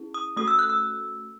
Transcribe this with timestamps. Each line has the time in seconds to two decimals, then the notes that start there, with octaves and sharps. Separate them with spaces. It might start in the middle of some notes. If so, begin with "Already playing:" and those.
Already playing: C#4 E4 G#4
0.14 D#6
0.36 A3 C#4 F#4 A4 D#6
0.48 E6
0.59 F#6
0.70 E6